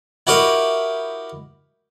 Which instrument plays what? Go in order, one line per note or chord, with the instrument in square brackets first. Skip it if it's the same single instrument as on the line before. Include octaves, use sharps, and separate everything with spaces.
[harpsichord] E4 F#4 G4 A#4 B4 D#5